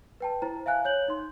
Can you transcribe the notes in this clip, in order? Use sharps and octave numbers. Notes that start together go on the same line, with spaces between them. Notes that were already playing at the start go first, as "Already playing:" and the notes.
B4 G5 A5
E4 C5 A#5
E5 F5 G#5 F#6
C#5 G6 F#7
D#4 C6